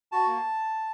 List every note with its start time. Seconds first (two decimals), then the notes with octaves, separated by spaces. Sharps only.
0.12 F#4 A5
0.27 A#3